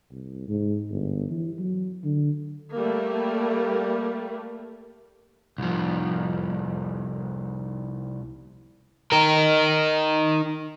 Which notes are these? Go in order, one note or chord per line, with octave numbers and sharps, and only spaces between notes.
C2
G#2
G1
E3
F#3
D3
G3 A3 A#3
C2 F3
D#4 A#4